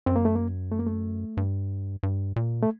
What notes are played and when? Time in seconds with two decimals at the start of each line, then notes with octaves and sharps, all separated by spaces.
0.06 F#2 C4
0.16 A#3
0.25 A3
0.35 A#3
0.71 A3
0.79 A#3
0.87 A3
1.37 G2
2.03 G2
2.36 A#2
2.63 A3